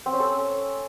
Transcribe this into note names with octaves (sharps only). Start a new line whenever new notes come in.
C4
C#4
A4